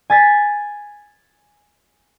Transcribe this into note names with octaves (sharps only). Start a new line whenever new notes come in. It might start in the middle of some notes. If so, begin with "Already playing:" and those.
G#5 A6 B6